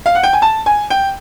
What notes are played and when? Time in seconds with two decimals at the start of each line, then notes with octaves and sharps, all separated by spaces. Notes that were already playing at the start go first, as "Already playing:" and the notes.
0.06 F5
0.15 F#5
0.23 G5
0.33 G#5
0.42 A5
0.66 G#5
0.90 G5